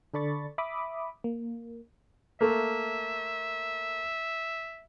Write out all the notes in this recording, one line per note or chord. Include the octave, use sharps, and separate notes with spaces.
D3 A4 D5 B5 C#6 A6
E5 B5 D6 D#6
A#3
A3 A#3 E5